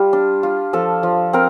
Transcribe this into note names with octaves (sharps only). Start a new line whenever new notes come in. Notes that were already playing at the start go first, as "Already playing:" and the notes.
Already playing: G3 F4 G4
D4
F4
F3 A4
F3
C4 A#4